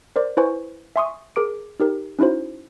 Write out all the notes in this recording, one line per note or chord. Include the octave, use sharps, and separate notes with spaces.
A#4 C5 D5
E4 B4 C5 G#5 C#6
E5 G#5 C6 C#6 D#6
G#4 A#4 D6 D7
D#4 G4 A#4
C#4 D#4 E4 F#4 C5